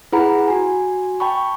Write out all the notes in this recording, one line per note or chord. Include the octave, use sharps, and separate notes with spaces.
E4 G#4 B4 F#5 A#5 B5
F#4 G#5
G5 A5 B5 C#6